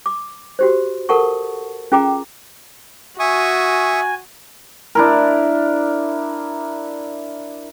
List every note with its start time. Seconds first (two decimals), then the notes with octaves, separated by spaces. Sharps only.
0.06 D6
0.59 F#4 G4 C5
1.09 A4 A#4 F#5 A5 C#6
1.92 C#4 F4 G#4 G5 A#5 D6
3.19 F#4 E5 G#5 C#6 D#6
4.95 D4 E4 A#4